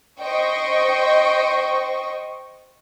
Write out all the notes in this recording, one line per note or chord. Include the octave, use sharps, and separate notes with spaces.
C5 D#5 G5 C#6